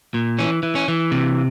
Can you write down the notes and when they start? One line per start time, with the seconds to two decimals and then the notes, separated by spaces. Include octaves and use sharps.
0.14 A#2
0.39 E3 C#4
0.63 E3
0.75 C#4
0.88 E3
1.11 C3